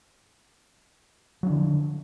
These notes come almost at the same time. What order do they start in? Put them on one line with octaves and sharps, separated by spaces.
F#3 D4 D3 F3